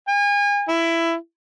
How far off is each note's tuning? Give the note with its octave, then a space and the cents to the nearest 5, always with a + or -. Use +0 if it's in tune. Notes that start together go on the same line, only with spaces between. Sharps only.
G#5 -35
E4 +15